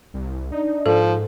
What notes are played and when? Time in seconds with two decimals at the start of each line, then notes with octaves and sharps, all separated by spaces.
0.14 C2
0.52 D4 D#4
0.86 G#2 F3 A4